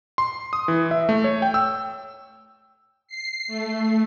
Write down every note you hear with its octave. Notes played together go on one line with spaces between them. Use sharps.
C6
D#6
E3
E5
A3
C#5
G5
E6
C7
A3